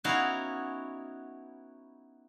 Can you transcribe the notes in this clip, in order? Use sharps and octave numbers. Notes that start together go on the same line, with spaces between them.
B3 C#4 D#4 E4 F#4 F5